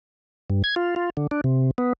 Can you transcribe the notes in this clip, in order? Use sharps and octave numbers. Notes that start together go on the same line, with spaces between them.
G2
G#6
F4
F4
D3
D4
C3
B3